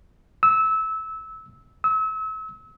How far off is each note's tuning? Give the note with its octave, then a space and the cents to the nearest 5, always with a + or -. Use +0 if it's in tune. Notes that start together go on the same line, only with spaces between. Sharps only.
E6 -20
E6 -35